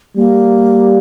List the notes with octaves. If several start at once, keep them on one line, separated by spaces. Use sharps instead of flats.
G3 A#3